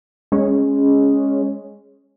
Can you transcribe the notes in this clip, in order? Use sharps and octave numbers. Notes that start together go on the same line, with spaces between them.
G#3 C#4